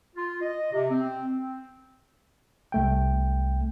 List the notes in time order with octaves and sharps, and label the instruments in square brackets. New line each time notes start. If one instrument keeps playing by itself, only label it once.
[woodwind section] F4
D#5
C3
C4
C4
[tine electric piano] C2 A3 G5